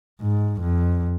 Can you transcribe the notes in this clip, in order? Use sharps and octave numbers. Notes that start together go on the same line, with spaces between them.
G#2
F2